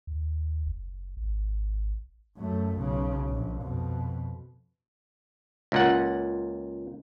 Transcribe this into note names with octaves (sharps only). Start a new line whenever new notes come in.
D#2
F#1
G#1
F#2 A3
B1 C#3
A#1
F2 B2
C#2 A#2 F#5